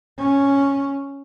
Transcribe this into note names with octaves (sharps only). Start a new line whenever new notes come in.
C#4